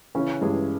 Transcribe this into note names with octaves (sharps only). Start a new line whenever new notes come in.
C#3 E3 C#4
G2 E3 G#3